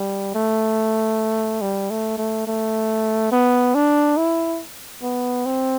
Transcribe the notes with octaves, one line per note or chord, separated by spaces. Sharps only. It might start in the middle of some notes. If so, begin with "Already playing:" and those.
Already playing: G3
A3
G3
A3
A3
A3
B3
D4
E4
B3
C4